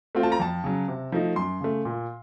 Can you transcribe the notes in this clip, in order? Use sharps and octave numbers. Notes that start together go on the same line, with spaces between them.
A3 C4 F4
A5
A#5
F2 A5
C#3 F#3
C3
F3 A3 D#4
F#2 C6
C#3 A3
A#2